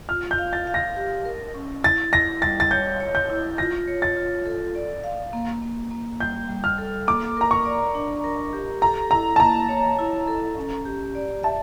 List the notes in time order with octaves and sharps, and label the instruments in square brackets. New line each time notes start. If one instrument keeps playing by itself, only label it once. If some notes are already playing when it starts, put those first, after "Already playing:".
[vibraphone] F4 [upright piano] F6
[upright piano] G6
[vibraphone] F5
[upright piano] A6
[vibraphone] F5
[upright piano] A#6
[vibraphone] G4
A#4
C#4
[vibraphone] E4 [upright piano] A6
[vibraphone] E4 [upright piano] A#6
[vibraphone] G3 [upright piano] A6
[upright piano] A6
[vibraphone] C#5 [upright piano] G6
[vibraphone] C#5
[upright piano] G6
[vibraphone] E4
[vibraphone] F4 [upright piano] A#6
[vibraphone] C#5
[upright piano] A6
[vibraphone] F4
A4
D5
F5
A#3
A#3
A#3
[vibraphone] G3 [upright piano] G6
[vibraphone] G3
[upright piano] F6
[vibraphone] A4
[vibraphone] A#3 [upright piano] D6
[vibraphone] A#4 [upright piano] A#5
[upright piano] C#6
[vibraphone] D5
D4
A#4
G4
[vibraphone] A4 [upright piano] A#5
[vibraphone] E4 [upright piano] A#5
[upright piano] A5
[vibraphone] A#3 [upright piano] A#5
[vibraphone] C#5
E4
A4
C#4
G4
D5
[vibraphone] E5 [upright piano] A5